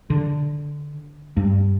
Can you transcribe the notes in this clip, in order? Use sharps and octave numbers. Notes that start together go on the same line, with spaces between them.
D3
G2